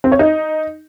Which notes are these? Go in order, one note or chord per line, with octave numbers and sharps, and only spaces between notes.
C4
C#5
D#4